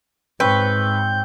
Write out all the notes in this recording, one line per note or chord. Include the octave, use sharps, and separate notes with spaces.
G#2 C4 B4 C#5 C#6 G6